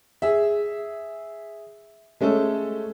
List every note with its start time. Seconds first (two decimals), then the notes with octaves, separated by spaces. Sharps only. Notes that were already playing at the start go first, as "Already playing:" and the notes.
0.22 G#4 E5
2.21 G#3 A3 C#4 A4